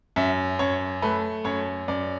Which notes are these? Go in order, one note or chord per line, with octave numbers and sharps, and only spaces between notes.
F#2 E5
F#2 C#5
A3 B4
F#2 C#5
F#2 D5